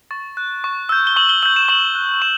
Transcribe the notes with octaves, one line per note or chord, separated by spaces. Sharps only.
C#6 A6
F#6
C#6
E6 G6
G7
C#6 F#7
G7
E6 G6 F#7
E7
C#6 F#7
F#6
C#6 E7